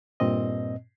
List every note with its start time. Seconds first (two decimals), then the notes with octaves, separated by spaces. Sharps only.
0.20 G2 A#2 C4 D#5